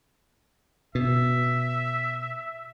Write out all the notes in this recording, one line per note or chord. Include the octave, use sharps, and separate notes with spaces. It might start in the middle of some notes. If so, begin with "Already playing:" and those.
B2 E5